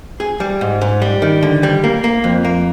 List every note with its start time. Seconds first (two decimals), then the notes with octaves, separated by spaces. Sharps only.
0.20 G#4
0.40 G3
0.61 G#2
0.81 G#2
1.02 G3
1.22 D#3
1.43 D3
1.63 G3
1.84 A#3
2.04 A#3
2.24 F2
2.45 A#3